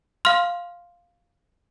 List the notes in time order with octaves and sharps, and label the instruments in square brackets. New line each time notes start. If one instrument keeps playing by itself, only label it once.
[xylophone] F5 C6 F6